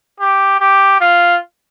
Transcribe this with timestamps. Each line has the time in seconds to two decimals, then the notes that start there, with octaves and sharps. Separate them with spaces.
0.20 G4
0.60 G4
1.01 F4